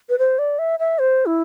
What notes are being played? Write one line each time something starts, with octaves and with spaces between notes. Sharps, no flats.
B4
C5
D5
E5
E5
C5
E4